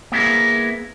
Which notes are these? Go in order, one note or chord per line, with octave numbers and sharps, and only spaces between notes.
A#3 B3 E4 F#4 G#4 A#4